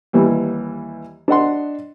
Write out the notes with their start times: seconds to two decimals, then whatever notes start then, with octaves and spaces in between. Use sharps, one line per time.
0.13 D#2 E3 G3
1.28 D4 D#5 F#5 C6